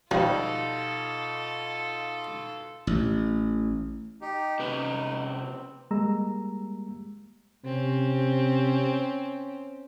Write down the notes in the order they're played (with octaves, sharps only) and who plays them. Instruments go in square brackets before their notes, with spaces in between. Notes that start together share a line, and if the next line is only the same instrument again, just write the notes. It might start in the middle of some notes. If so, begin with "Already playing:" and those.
[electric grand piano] B2 D#4 F5 [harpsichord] F3 [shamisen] G3 [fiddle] F4 A4
[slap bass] A1
[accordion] D#4 G4
[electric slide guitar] C3 C#4 B4 [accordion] D#4
[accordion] C4
[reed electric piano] G3 G#3 A#3 A#5 E6
[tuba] C3 [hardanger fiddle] C4 C#4